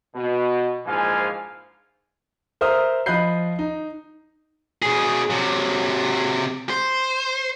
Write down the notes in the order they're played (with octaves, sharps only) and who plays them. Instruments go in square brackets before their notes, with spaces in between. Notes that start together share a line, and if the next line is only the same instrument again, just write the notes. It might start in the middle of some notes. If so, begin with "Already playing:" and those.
[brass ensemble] B2
A#1 G#2 E3 F3 F5 G#5
[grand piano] A#4 C5 E5 D#6 F6
F3 D#5 B5 F#6 G6 C7
D#4
[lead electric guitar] B2 G#4
C3 F#3
C5